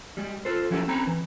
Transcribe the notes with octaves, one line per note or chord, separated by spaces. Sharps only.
G3 G#3
F4 A4 C5
F3 F#3 C#4 E4 G4 A4
C4 C#4 A#5 B5
E3